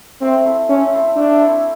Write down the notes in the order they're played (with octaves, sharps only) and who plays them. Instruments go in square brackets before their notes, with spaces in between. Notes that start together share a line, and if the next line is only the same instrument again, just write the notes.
[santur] A3 [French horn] C4
[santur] C4 E4 A4
[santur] A3 [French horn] C#4
[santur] C4 E4 A4
[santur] A3 [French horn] D4
[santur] C4 E4 A4